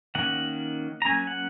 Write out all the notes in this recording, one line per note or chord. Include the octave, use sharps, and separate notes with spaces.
D#3 A#3 C#4 F#5
A#5
F#3 A#3 C#4 G#5
F#5